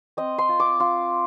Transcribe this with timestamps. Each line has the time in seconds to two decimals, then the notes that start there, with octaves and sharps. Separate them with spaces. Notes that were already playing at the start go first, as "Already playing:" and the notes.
0.17 C4 D#5
0.38 C6
0.49 F4
0.60 D6
0.80 F4